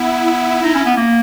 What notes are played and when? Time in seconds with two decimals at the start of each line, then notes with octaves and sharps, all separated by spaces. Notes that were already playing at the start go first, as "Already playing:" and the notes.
Already playing: B3 E4
0.63 D#4
0.75 C#4
0.86 B3
0.97 A#3